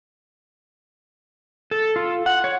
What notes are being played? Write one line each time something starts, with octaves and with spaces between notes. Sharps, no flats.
A4
F4
F#5
C#5